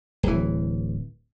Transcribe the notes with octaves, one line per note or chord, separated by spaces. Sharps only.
D1 E3